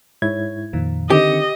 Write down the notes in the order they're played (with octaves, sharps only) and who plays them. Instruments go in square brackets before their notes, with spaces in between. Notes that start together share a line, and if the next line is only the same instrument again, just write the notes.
[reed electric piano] G#2 E4 G#6 [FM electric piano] C#5
[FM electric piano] F2 A#2 D#3
[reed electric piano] D3 D#3 C4 [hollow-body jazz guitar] G4 [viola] D#5 [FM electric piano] C#7